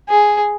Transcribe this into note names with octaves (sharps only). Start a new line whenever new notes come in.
G#4